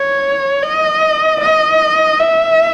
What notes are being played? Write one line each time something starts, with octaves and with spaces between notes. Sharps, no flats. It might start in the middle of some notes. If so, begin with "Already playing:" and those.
Already playing: C#5
D#5
D#5
E5